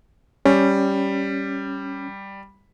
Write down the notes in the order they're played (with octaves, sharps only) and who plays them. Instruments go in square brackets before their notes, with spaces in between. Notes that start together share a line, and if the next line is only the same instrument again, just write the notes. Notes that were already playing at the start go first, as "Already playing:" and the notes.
[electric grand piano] G3 [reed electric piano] C#4